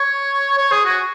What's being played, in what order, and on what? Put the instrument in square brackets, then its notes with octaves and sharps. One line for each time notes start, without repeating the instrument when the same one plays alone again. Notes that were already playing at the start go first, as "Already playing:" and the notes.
Already playing: [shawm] C#5
C#5
G#4
F#4